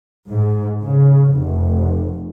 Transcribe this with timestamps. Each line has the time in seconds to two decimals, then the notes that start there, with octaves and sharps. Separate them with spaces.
0.29 G#2
0.82 C#3
1.34 F1